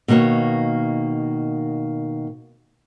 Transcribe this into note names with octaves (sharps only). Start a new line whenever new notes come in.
B2 D#3 A#3 C#5